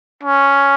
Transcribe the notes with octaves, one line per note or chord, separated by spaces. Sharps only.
C#4